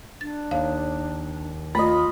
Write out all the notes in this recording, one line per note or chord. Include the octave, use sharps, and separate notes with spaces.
D4 A6
D#2 F5
A3 F4 D#5 B5